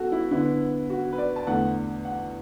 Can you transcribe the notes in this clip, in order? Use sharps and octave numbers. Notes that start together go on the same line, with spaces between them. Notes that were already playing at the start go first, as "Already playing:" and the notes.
Already playing: B3 F#4 A4
E4
D3 B3 D4 E4
F#4
B4
D5
A5
E2 D3 A3 D4 F#5
F#5